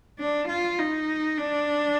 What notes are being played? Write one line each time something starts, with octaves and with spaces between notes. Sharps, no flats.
D4
F4
D#4
D4